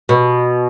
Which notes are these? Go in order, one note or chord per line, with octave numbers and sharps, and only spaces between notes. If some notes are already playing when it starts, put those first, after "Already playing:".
B2